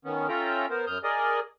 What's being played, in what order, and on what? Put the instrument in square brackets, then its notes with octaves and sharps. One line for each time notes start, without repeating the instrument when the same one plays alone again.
[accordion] D#3 B3 C#4
C#4 F4 A4 E5 G5 A#5
B3 A#4 C5
F#2 D#6 F6 G6
G#4 A#4 D5 D#5 G#5